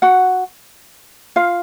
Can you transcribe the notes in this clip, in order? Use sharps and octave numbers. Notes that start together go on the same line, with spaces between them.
F#4 F#5
F4 F5